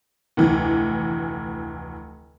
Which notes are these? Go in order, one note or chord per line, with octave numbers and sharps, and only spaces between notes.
F1 D2 E3